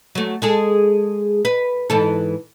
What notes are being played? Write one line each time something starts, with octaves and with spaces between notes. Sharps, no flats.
F#3 A3
G#3 G#4 A4
B4
G#2 E3 A4